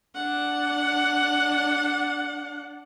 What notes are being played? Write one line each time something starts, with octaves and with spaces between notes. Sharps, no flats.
D4 F#5